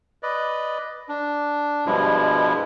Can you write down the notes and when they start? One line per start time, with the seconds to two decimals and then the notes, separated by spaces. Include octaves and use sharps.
0.23 B4 D5 D#5
1.09 D4
1.86 G2 B2 F3 G3 G#3 E4